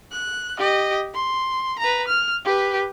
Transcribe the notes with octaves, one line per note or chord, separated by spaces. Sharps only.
F#6
G4 D#5
C6
B4 A#5
F6
G4 B4